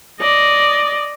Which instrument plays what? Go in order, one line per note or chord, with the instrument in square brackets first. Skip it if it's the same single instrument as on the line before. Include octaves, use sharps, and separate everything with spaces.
[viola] D5 D#5